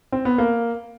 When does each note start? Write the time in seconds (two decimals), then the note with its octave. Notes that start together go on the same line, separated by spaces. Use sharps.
0.12 C4
0.25 B3
0.38 A#3